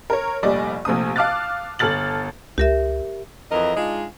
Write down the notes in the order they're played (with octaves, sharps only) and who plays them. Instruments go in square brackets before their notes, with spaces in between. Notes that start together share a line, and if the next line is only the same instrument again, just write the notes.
[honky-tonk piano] A#4 C#5
F1 A#1 G3 D5 D#5
A#1 C3 A3 D#6
F5 A5 D6 F6 F#6 A6
G1 A4 F6 A6 F#7
[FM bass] C#2 [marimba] G4 A#4 E5
[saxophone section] F2 E3 A#4 D#5
G#3 D4 D#4 F4 D#5